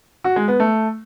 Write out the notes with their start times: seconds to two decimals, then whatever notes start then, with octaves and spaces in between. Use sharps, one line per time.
0.24 F#4
0.36 G#3
0.48 B3
0.60 A3